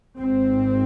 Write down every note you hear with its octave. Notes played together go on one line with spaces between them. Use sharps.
G#1 G#2 C4